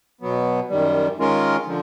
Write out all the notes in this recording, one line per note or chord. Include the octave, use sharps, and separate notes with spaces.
B2 F#3 B3
F#2 D#3 G3
D#3 G#3 C#4 F4 A#4
D3 F3